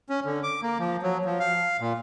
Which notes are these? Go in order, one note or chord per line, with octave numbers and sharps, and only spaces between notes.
C#4
D3
D6
A#3
F3
F#3
F3
F5
A#2